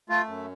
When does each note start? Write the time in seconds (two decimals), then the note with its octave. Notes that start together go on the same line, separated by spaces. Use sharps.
0.09 A3 F4
0.28 F#2